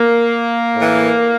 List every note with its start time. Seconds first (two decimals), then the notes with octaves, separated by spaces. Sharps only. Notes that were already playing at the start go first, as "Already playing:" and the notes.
Already playing: A#3
0.76 A2 E3